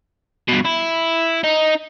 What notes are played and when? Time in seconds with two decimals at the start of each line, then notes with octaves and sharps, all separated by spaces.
0.48 G2 B2
0.65 E4
1.44 D#4